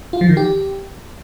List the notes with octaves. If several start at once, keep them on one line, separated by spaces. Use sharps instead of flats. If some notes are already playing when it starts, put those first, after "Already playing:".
F4
F3
D#3
G4